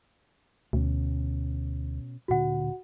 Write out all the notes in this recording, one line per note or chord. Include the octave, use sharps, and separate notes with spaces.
D2 B2 C#4
D1 A#2 D3 F#4 F#5